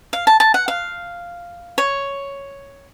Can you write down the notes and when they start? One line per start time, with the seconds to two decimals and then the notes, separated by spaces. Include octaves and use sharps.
0.13 F5
0.27 A5
0.40 A5
0.54 F#5
0.68 F5
1.78 C#5